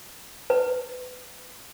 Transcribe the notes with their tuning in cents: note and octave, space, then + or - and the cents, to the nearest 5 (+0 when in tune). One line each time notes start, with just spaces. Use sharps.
B4 +20